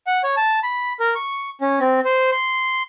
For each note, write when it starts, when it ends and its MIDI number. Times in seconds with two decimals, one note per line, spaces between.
0.07 0.22 78
0.24 0.35 73
0.37 0.59 81
0.63 0.93 83
1.00 1.14 70
1.15 1.50 85
1.61 1.79 61
1.80 2.00 60
2.05 2.30 72
2.32 2.83 84